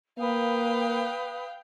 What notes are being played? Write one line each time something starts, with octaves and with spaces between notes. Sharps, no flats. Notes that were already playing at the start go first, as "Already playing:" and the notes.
A#3 B4 F5 G5 D#6